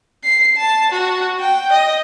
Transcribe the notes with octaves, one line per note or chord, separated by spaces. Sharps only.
C7
A5
F#4
G5
D#5